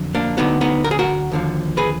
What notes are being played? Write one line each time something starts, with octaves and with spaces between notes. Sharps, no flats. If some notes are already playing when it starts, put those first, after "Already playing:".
Already playing: F2 D3 F#3
A#3 D4
D2 D3 F#3 B3 D#4
B3 D#4
A#4
G#4
F#4 A#4
D#2 D3 F3
G#4 B4